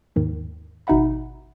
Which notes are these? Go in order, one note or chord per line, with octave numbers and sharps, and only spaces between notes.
D#2 G#2 D#3
G#1 B2 D#4 E5 F#5 B5